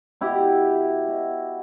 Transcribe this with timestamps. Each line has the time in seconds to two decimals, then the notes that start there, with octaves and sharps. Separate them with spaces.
0.21 B2 E4 G4
1.08 B2